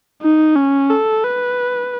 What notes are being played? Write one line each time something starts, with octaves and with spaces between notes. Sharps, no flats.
D#4
C#4
A4
B4